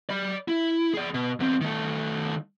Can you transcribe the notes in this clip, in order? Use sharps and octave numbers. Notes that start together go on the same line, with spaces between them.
D5 B5
E4
G#4 D5
B2
E2 C4
D#3 A3